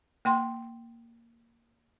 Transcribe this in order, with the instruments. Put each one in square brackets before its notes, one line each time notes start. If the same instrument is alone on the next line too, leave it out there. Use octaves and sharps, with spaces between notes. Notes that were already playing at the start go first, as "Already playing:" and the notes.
[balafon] A#3 G5 C6